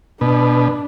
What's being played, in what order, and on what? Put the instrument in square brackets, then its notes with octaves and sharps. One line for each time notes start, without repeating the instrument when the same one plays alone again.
[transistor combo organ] B2 [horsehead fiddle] D4